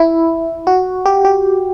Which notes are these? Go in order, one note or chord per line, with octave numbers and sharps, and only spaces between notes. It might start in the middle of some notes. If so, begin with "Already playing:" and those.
Already playing: E4
F#4
G4
G4